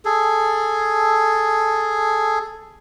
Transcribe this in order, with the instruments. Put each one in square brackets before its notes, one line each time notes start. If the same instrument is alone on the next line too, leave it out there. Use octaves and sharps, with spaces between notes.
[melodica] G#4 A4